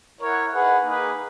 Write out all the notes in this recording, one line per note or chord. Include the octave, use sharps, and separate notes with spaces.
E4 A#4 C#5 F#5
D#4 G#4 B4 F#5
A#3 D#4 G#4 B4